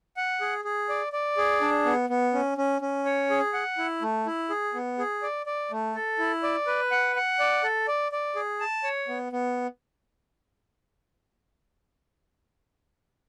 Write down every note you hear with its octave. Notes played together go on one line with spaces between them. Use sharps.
F#5
G#4
G#4
D5
D5
G#4
D4
B3
B3
C#4
C#4
C#4
C#5
G#4
F#5
E4
A3
E4
G#4
B3
G#4
D5
D5
A3
A4
E4
D5
B4
F#5
F#5
D5
A4
D5
D5
G#4
A5
C#5
B3
B3